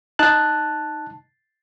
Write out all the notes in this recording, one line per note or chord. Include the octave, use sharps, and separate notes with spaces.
D#4 A5 F#6